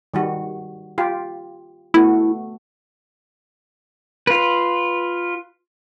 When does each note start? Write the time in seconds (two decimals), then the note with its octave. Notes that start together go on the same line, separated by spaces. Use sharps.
0.14 D#3 G3 F#4
0.98 F4 G4
1.94 A3 B3 E4 F#4
4.27 F4 B4